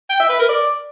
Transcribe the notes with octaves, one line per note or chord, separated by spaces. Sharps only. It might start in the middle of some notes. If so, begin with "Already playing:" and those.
G5
E5
B4
A#4
D5